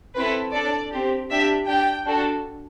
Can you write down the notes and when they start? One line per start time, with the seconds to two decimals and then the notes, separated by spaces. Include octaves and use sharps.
0.15 C4 E4 A4 B4
0.53 D4 A4 D5
0.91 C4 G4
1.30 D4 G4 E5
1.67 D4 G4 G5
2.06 D4 F#4 A4